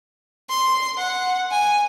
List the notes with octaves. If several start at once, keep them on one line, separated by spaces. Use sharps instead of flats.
C6
F#5
G#5